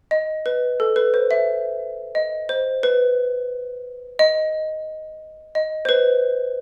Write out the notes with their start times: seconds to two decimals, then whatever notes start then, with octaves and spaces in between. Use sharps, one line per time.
0.11 D#5
0.46 B4
0.80 A4
0.96 B4
1.14 C5
1.31 E5
2.15 D#5
2.49 C5
2.83 B4
4.19 D#5
5.55 D#5
5.85 C5
5.89 B4